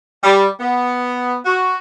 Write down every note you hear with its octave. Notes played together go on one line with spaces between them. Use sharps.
G3
B3
F#4